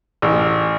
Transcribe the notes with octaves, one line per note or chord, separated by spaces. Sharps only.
A1